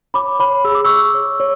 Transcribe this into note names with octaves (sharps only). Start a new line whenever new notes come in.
C#5 B5 D6
C#5 B5 D6
G#4 E6
D6
G#4 C#6 E6
C#5
C#5